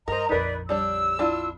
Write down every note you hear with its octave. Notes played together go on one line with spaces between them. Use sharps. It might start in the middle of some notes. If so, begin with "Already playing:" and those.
G2 A#4 C5 D#5 A#5
A#1 F2 D#4 A#4 B4 D5
G3 D4 C#5 E6
D4 E4 F4